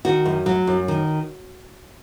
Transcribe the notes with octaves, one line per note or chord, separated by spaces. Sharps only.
D#3 F#4
F#2
F#3
F#2
D#3